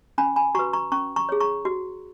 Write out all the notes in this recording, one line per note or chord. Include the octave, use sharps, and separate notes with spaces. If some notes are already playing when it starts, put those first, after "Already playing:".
C#4 G#5 B5
G#5 B5
F#4 B4 A#5 C#6
A#5 C#6
C#4 A#5 C#6
A#5 C#6
G#4 C#5
A#5 C#6
F#4